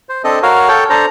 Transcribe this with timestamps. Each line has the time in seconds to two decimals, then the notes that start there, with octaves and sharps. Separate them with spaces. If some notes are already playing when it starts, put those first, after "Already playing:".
0.09 C5
0.24 C4 D4 A4 D#5
0.43 F#4 A#4 C#5 F5
0.68 A4 C#5 G5
0.90 D4 A4 C5 A#5